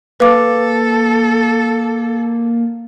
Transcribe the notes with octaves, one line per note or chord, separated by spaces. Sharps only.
A#3 A4 B4 F5 D6